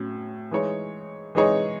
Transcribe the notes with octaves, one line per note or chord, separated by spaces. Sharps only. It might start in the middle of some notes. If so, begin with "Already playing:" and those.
Already playing: A2 F#3 C#4
E3 G#3 D#4 G#4 C#5
E3 G#3 D#4 G#4 C#5